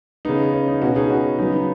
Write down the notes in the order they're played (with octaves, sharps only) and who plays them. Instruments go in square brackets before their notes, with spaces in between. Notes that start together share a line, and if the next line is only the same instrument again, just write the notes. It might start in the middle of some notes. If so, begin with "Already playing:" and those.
[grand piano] C#3 B3 D#4
C#4
D#4
B2 B3 C#4 F#4
D#4 G#4
C#4 F#4
C#3 F#3 B3 D#4 G#4
D#4